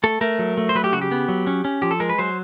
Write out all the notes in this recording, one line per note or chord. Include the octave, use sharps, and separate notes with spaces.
A3 A4
A3 A#4
F#3
A3
C5
F#3 B4
G4
C#3 F#4
G4
B3
F#3
C#4
C#4
F3 G4
A4
G#3 A#4
B4
F#3 C5